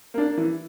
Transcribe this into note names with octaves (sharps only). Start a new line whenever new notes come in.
A#3 D4
E3